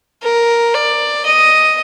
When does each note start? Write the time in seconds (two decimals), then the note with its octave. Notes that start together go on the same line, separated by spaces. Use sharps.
0.23 A#4
0.74 D5
1.26 D#5